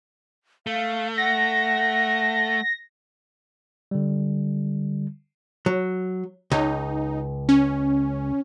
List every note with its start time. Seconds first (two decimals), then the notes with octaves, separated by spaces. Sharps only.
0.67 A3 F5
1.18 F#5 A#6
3.91 D3 G3
5.66 F#3
6.52 C#2 D#4
7.49 C#4